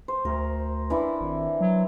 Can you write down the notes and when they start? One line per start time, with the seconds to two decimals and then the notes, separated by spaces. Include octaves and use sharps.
0.08 C5
0.25 D2 A#4
0.90 E3 D4 E4
1.21 G#1
1.61 F#3